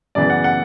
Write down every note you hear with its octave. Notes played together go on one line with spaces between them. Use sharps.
F#2 C#3 E3 B3 D5
F#5
F#5